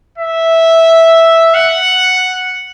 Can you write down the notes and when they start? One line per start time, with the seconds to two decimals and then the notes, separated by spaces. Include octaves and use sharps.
0.18 E5
1.54 F#5